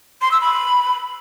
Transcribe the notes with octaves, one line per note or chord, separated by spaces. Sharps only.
C6
E6
B5